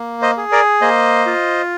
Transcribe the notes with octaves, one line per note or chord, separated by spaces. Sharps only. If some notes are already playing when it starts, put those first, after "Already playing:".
Already playing: A#3
C5 D#5
G#4
A#4 D5
A#3 C5 D#5
F4